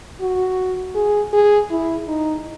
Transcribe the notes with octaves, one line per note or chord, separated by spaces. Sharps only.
F#4
G#4
G#4
E4
D#4